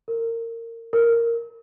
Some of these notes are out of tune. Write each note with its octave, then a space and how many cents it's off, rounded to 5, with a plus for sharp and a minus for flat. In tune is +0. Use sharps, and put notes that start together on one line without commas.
A#4 -25
A#4 -5